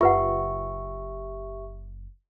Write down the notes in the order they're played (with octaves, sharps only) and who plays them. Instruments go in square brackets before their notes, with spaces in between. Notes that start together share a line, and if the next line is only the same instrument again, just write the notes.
[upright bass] F#1 D#4 [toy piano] F4 B4 F#5 [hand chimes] G4 E5 C#6